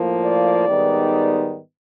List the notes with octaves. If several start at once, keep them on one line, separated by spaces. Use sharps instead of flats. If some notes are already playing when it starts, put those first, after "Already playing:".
Already playing: A2 F3 A#3
D5
G#2 D#3 G3 B3 D#4